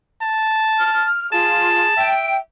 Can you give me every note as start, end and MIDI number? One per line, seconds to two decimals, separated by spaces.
0.22 1.07 81
0.79 1.30 89
1.32 1.86 65
1.32 1.92 68
1.32 2.12 81
1.97 2.41 76
1.97 2.37 79